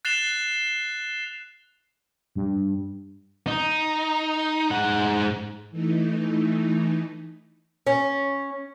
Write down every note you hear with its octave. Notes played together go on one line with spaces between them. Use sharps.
F#6 A6 C7 E7 F7 G7
G2
D#4
G#2 F#5
E3 A3 D#4
C#4